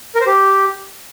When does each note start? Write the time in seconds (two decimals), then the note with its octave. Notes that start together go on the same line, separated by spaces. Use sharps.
0.15 A#4
0.21 C5
0.26 G4